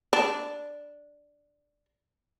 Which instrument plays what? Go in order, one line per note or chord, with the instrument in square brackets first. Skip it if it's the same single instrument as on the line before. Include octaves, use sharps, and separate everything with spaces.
[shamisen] D4